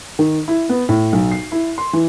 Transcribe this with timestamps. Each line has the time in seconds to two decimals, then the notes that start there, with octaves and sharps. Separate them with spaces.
0.19 D#3
0.48 E4
0.69 B3
0.89 A2
1.13 B1
1.32 C7
1.52 E4
1.78 C6
1.93 E3